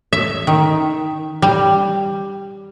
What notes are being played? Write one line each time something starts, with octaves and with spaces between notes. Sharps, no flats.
E5
D#3
G3